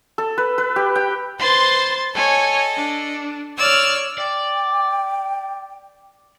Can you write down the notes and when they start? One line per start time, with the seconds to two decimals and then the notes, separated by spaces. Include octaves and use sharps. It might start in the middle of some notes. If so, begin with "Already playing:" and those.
0.18 A4
0.38 B4
0.58 B4
0.76 G4
0.96 G5
1.40 B4 C5 C6 A6
2.15 A4 C#5 D#5 G#5
2.77 D4
3.58 C#5 D5 E6 F6
4.18 D5 G5